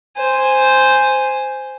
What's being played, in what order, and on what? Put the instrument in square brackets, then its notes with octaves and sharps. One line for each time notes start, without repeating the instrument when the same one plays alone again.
[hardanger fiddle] C5 G#5